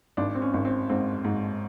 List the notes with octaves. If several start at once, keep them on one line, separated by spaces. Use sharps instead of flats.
G#1 D4
C4
C#4
G#1
C4
G#2 C4
G#2